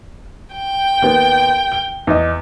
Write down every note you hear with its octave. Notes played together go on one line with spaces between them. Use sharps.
G5
D#2 B3
G7
E2 D#5